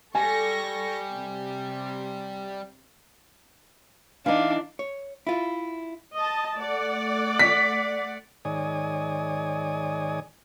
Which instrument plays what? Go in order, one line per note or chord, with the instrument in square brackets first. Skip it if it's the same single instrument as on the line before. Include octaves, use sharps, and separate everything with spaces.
[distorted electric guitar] G3 [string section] A4 C#6 A#6 [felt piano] G#5
[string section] C3
[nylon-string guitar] E3 D#4 [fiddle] D4 [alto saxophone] F5
[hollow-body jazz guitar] C#5
E4 F4
[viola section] D#5 A5
A3 D5 F#5
[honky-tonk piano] B6
[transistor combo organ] G#2 D#3 C#5 D5 G#5 D#6